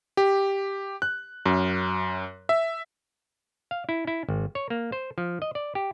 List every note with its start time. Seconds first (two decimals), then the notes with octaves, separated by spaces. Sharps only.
0.17 G4
1.02 F#6
1.46 F#2
2.49 E5
3.71 F5
3.89 E4
4.07 E4
4.29 G#1
4.55 C#5
4.70 A#3
4.92 C5
5.18 F3
5.42 D#5
5.55 D5
5.75 G4